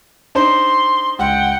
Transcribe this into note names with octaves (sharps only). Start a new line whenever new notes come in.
D4 D#4 C5 C6
C#2 F#5 G5